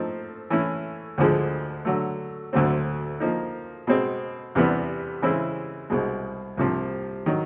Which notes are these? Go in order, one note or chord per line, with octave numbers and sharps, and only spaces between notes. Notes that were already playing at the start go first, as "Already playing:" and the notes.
Already playing: F3 A3 C4 D#4
E3 A3 C#4 E4
D2 D3 F3 G#3
D3 F#3 A3
D2 D3 F#3 A3 C4
F3 A#3 D#4
B2 G#3 C4
E2 C3 E3 G3 B3
C#3 E3 G#3 C4 E4
C2 B2 G#3
C2 C3 F3
D#3 F#3